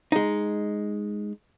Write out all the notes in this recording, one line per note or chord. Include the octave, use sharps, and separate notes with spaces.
G#3 D#4